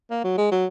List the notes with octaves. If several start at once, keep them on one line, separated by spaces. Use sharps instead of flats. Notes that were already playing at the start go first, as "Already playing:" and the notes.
A#3
F#3
G#3
F#3